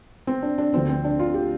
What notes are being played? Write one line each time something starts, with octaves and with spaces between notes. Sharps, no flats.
C4
D4
D4
D2 D3 F3 C4
C4
D4
F4
G4